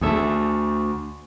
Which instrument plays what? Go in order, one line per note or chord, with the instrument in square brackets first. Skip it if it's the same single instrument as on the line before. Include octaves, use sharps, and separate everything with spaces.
[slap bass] D2 [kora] G#4 A4 E5